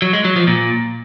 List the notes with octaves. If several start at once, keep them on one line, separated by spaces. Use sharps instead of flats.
F#3
G#3
F#3
F3
A#2